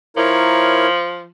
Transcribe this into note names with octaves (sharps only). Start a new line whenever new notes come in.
F3 E4 A#4 C#5